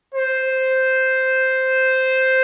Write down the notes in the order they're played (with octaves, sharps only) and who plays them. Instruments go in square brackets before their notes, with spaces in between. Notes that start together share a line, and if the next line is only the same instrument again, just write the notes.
[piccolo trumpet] C5